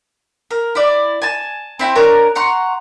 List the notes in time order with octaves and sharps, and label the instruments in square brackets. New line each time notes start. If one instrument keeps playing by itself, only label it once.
[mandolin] A#4
E4 D5
G#5 A5
C4 E4 G5
D4 A#4 C#5
F#5 A#5 C6 C#6